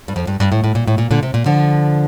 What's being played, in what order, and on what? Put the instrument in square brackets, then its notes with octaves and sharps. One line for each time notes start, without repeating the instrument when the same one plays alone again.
[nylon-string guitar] G2
F2
G2
G2
A2
A2
A#2
A2
A#2
A#2 D3
C3
A#2
D3 F3